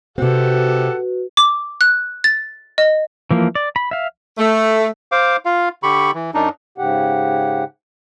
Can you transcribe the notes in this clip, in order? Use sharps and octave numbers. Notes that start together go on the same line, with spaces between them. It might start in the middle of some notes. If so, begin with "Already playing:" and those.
C3 C4 F#4 G4 A4 B4 F#5
D6
F#6
A6
D#5
E3 F3 A#3
D5
B5
E5 F5
A3
C5 F5 D6
F4 F5
D3 G4 B5 C#6
E3
F#2 D4 D#4
G#2 C#3 G4 F#5